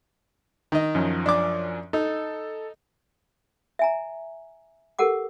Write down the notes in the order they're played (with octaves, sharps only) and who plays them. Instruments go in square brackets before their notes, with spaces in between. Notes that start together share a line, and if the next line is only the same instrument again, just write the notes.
[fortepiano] D#3 D#5
[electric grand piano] F#2 F3 C#4
[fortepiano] D4 D6
[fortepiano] D#4 [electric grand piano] A4
[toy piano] E5 G#5 A#5
G4 A4 A#4 F#5 D6